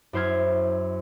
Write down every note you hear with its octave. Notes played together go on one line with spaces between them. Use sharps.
F#2 E4 C5 F6 G#6